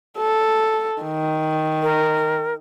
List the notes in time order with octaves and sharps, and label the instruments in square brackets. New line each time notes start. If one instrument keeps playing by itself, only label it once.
[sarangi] A4
D#3
[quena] A#4